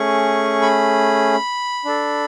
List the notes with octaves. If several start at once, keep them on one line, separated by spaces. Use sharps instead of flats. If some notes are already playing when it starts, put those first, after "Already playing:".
Already playing: A3 C#4 G#4 C#6
B5
D4 A4